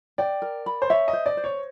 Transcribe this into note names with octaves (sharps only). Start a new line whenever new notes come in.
D5 G5
A#4
B5
C5
C#5 E5
D#5
C5
D5
C5
C#5